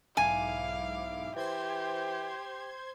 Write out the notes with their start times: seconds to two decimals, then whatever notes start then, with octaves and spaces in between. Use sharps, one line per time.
0.17 B1 G#2 E4 F5 G#5 D6
1.36 E3 G4 C5 C6 G#6